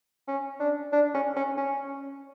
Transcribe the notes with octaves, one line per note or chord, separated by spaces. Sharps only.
C#4
D4
D4
C#4
C#4
C#4